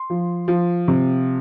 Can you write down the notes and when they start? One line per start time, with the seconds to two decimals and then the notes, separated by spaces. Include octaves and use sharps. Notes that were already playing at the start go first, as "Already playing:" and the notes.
Already playing: C6
0.10 F3
0.48 F3
0.88 C3